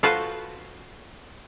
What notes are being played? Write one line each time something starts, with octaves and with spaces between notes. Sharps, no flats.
F4 F#4 A4 B4 C5